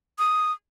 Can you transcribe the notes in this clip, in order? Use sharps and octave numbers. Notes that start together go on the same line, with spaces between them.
D#6